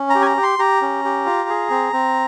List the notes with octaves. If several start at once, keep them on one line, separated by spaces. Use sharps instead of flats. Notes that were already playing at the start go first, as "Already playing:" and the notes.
Already playing: C#4
A#5
G4
G#5
A#5
G4
C6
G4 A#5
C#4
G4
F4
G#4
C4
C4